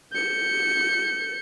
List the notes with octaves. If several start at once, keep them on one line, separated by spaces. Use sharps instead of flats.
G6 C#7